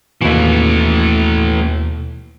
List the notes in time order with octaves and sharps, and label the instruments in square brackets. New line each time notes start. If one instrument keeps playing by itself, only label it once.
[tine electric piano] D#2 B2 [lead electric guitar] E3 A3